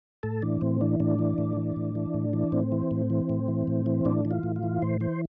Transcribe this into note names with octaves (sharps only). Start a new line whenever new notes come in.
A2 A4
E3 D4
A2 C4
E3 D4
A2 D4
E3
A2
E3
A2
E3
A2
E3
A2 C4
E3
A2
E3
A2
E3
A2
E3
A2 D4
E3
F4
A2
F4
E3
A2 C5
E3 C5